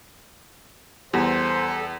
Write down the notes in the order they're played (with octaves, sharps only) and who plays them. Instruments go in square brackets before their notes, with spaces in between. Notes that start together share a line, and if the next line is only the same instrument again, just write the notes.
[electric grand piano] E2 [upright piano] G3 [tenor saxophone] A4 [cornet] C5